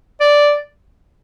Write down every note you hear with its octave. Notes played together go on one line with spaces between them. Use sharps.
D5